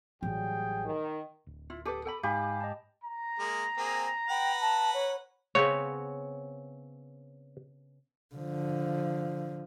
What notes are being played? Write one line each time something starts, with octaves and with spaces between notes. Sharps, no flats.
A1 F#3 G3 G#4 G5
D#3
D1
E4 F4
G4 A4 B4 D6 D#6
A4 G5 B5
G#2 D#4 G4 F5 G#5 B5
D#5 A5
A#5
G#3 A#3
A#3 C4 G#4
B4 F#5 G5
A5
C#5
C#3 B3 C4 C#5
D3 F3